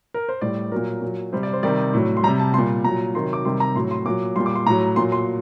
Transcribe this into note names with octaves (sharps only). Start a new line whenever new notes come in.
A#4
C5
A2 G3 D5
A#2 F#3 A#4
A#2 F#3
C3 G3 C5
D5
C5
C3 D#3 G3 D5
A2 F#3
C6
C3 G3 A#5
A5
A#2 G3 C6
A#2 F#3 A#5
C3 D#3 F#3 C6
D6
C3 D#3 G3 C6
A#5
A2 F#3 C6
C6
A#2 F#3 D6
A#2 G3 C6
D6
C6
A2 F#3 A#5
A#2 F#3 C6
C6